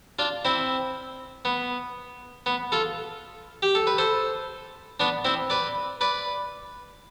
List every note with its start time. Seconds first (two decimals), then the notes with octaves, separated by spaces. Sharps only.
0.19 D4 F4
0.45 C4 E4
1.45 B3
2.46 B3
2.72 F4 A4
3.62 G4
3.75 A4
3.87 B4
3.98 A4 C5
5.00 B3 D4
5.25 C4 E4
5.50 B4 D5
6.01 B4 D5